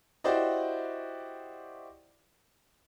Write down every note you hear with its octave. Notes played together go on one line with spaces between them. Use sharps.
E4 F#4 G4 C5 D5 D#5